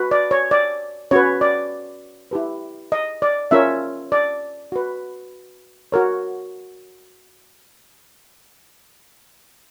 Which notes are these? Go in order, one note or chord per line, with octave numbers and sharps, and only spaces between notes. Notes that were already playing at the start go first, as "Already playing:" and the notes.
Already playing: F#4 B4
D5
C#5
D5
C#4 F#4 B4 C#5
D5
E4 G4 B4
D#5
D5
C#4 F4 A#4 C#5 E5
D5
F#4 B4
F#4 A#4 C#5